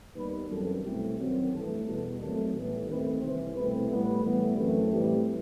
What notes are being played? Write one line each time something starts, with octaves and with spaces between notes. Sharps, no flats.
D#2 D#3 G3 B3 B4
F#2 E3 G3 C4 A4
C2 B2 A3 C4 G4
F#2 D#3 F#3 C4
A1 G2 E3 A3 A4
E2 B2 G3 A4
D#2 D#3 F#3 A3 C4 A4
A1 A2 E3 G3 B3 A4
D#2 D#3 A3 C4 B4
C2 C3 E3 C5
C2 B2 A3 C4 B4
A2 G3 B3 B4
A2 E3 G3 B3
F#2 E3 A3 C4
A2 E3 G3 C4 G4